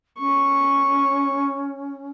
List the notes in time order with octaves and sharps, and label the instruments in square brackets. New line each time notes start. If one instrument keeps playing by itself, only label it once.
[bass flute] C#4 [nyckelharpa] C#6